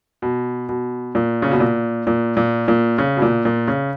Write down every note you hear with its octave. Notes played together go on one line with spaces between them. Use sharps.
B2
B2
A#2
C#3
B2
A#2
A#2
A#2
A#2
C#3
B2
A#2
A#2
C#3